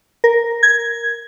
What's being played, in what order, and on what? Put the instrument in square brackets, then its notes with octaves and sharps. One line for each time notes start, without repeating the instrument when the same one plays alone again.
[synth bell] A#4
G#6